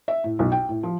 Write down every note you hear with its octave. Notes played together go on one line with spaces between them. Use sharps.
E5
A2
B1
G5
A2
F3